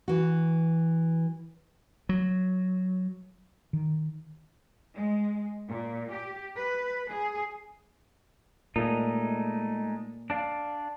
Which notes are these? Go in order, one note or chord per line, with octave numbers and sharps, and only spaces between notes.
E3 F#4
F#3
D#3
G#3
A#2
G4
B4
G#4
A#2 G#3 A3 D#4
D4 D5 F5